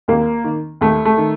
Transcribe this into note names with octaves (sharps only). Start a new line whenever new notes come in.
D#2 A#3
D#3
D#2 A3
A3
D#3